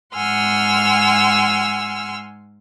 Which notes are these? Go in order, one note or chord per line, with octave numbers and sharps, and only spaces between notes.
G#2 F#5 G#5 C6 E6 F6